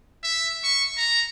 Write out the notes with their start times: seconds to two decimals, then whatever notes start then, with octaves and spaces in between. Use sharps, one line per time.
0.23 E5
0.64 C#6
0.97 A#5